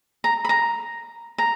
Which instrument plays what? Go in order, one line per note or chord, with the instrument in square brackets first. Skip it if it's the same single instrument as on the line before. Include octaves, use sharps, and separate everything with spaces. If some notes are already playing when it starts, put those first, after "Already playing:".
[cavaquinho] A#5
B5
A#5
A#5